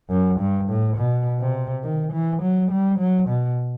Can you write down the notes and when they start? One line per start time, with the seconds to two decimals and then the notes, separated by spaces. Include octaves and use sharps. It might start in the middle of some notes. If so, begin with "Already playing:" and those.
0.10 F#2
0.40 G2
0.69 A2
0.98 B2
1.40 C3
1.84 D#3
2.13 E3
2.42 F#3
2.71 G3
2.99 F#3
3.29 B2